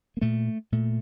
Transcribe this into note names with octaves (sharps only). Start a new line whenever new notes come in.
A#3
A#2 A3
A#2 A3